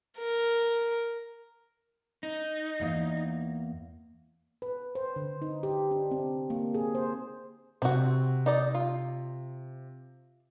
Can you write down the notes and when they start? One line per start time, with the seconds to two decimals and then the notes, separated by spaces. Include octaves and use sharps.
0.18 A#4
2.23 D#4
2.80 E2 A#3 F5
4.62 B4
4.95 C5
5.16 D3
5.42 D#4
5.63 G4
5.91 D4
6.11 C4
6.50 A#3
6.75 G#4
6.95 C5
7.82 C3 C4 F#4
8.46 D#4 D5 D#5
8.74 F4